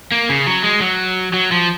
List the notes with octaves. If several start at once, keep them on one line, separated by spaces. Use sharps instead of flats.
A#3
C#3
F#3
G#3
F#3
F#3
F3